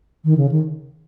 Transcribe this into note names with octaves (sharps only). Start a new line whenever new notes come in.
D#3
C#3
D#3